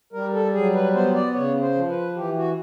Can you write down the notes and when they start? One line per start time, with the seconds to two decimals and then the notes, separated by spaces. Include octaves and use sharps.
0.13 G3 A#4
0.34 A4
0.54 F#3 G#4
0.75 B4
0.95 B3 C5
1.15 D5
1.34 C#3 C#5
1.61 C5
1.75 F3
1.89 B4
2.16 E3 G4
2.36 F#4